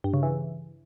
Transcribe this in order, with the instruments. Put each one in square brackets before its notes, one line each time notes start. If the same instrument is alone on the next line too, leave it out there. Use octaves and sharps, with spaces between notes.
[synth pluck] G2
C#3
E3